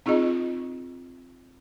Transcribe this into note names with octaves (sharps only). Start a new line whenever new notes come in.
C4 D#4 F4 G#4 D#5